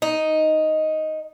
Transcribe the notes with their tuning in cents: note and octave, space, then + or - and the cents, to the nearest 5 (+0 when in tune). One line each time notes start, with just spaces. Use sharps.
D#4 +5